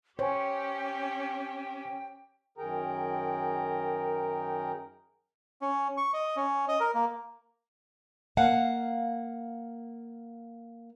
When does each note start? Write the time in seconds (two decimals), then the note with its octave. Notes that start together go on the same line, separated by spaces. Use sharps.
0.19 C#4 G4 C5 C#5 G5 G#5
2.58 F#2 D#3 G#4 A#4 G5 A#5
5.61 C#4
5.97 C#6
6.14 D#5
6.36 C#4
6.68 D#5
6.80 A#4
6.94 A#3
8.37 A#3 F5 F#5